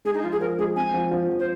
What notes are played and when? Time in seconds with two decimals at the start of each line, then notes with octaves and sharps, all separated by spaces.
0.05 G#3 G#4
0.14 D#4
0.23 F3 F4
0.32 G#4
0.40 F3 A#4
0.58 G#3 G#4
0.76 C4 G#5
0.94 F3
1.11 F3
1.29 F3
1.39 C5